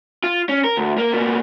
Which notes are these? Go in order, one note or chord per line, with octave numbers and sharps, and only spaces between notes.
F4
C#4
A#4
D2
A#3 A#4
B2 A#3